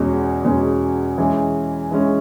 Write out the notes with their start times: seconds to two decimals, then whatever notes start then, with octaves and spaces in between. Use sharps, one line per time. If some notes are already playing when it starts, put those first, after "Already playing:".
Already playing: E2 B2 G#3 C#4
0.44 E2 B2 G#3 C#4
1.18 E3 G#3 C#4
1.91 E3 G#3 C#4